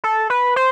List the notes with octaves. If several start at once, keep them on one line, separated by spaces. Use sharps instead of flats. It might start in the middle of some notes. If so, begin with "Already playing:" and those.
A4
B4
C5